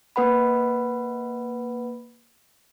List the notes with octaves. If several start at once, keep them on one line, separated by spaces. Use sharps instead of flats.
A#3 B4 F#5 B5